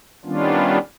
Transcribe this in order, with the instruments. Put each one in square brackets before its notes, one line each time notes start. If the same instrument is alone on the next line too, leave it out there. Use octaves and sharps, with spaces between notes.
[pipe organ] D#3 G3 B3 C#4 D4 F4